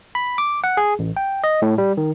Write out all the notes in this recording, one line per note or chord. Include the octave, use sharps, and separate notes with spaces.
B5
D6
F#5
G#4
A1
G5
D#5
A2
G3
D#3